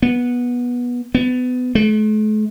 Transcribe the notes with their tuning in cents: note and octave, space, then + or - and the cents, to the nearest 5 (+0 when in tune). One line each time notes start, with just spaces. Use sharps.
B3 -15
B3 +25
A3 -45